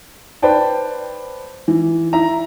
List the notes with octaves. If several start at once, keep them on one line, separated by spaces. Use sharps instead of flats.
B4 C5 D5 G5 A5
E3
E4 E5 A#5